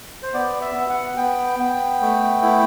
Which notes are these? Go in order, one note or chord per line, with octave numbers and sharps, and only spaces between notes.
C5
B3 D5
E5
B3
F#5
B3 G5
B3
A3
E4